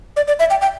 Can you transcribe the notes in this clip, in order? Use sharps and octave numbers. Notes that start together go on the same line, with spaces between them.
D5
D5
E5
G5
G5